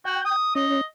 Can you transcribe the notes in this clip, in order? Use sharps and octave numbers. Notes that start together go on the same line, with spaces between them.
F#4 G5
D#6
C#4 D#5